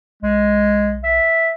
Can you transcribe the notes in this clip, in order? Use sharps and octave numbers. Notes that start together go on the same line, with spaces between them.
B1 G#3
E5